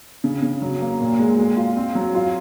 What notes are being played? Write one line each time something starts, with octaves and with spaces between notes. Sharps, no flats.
C#3
C#3
F#3
A#3
A#2
G#3
G#3
F4
C4
F#3
F4